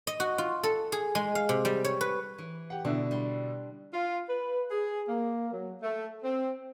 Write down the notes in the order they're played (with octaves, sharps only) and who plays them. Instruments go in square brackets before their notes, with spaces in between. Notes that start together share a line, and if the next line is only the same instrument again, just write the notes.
[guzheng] D#5
F#4
F4
A4
G#4
G#3
F5
C3
G3
C#5
B4
E3
[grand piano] G4 F#5
[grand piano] B2 D3 E4 [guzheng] D4
[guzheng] G3 C6
[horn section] F4
B4
G#4
A#3
F#3
A3
C4